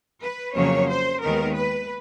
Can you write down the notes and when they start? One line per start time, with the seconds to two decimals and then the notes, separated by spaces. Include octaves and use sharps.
0.22 B4
0.54 F2 C#3 F#3 A#3 C#5
0.88 C5
1.22 D#2 D#3 G#3 B3 A#4
1.55 B4